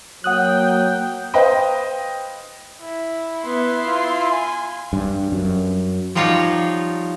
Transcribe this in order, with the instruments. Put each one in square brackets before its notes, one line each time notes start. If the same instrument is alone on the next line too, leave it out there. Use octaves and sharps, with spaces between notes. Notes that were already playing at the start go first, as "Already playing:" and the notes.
[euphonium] F#3 [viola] A#3 G5 [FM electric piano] F#5 D#6 F#6
[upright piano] B4 C5 D#5 F5 G5
[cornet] E4
[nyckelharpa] B3 [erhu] C6
[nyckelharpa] F4
[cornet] G#5
[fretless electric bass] G2
F#2
[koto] F3 G3 D#4 F4 F#4 C#5